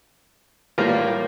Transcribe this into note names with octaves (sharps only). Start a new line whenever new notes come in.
A2 G3 A#3 F4 A#4